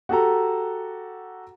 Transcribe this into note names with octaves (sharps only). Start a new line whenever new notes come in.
F#4 G4 A4 A#5